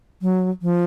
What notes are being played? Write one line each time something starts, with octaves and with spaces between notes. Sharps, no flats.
F#3
F3